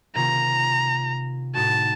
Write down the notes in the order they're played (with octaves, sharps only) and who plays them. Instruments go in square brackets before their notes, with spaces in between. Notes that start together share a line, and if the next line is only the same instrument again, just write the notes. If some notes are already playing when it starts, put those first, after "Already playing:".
[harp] C3 D#3 A#3 C#4 F4 [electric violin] A#5
[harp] A2 A3 D#4 F#4 [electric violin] A5